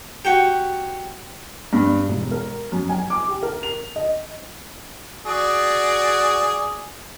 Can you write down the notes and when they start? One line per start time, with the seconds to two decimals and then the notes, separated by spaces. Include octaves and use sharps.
0.25 F#4 G4
1.73 G2
2.08 E1
2.31 A#4
2.72 F#2
2.89 G#5
3.10 D6
3.28 G4
3.43 A#4
3.63 F7
3.96 D#5
5.26 F#4 G#4 D5